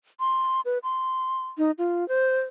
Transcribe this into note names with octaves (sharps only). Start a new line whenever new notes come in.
C6
B4
C6
D#4
F4
C5